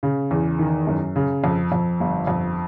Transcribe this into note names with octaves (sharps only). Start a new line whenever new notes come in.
C#3
E2
D#3
F#2
C#3
F2
F2
G1
F2